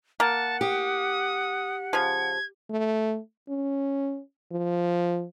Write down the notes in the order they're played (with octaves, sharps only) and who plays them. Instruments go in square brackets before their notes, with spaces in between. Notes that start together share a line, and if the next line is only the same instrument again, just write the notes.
[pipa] A#3 [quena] F#5 [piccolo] A5
[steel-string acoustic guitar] G4 [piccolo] D#6
[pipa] C#3 F3 [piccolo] G#6
[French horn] A3
C#4
F3